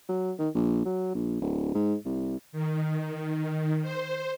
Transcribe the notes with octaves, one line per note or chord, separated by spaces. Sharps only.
F#3
D#3
A#1
F#3
A#1
D1
G#2
C2
D#3
C5